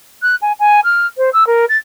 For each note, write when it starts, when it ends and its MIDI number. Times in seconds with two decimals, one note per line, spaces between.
0.22 0.35 90
0.42 0.52 80
0.59 0.80 80
0.84 1.06 89
1.17 1.30 72
1.33 1.46 88
1.47 1.65 70
1.69 1.77 93